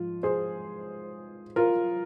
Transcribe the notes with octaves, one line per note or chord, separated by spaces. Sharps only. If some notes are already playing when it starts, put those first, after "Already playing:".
Already playing: G#2 F3 F4
G#4 C5
F4 A#4